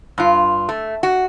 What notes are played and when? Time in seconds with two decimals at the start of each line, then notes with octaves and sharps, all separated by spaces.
0.18 G2 F4
0.69 A3
1.03 F#4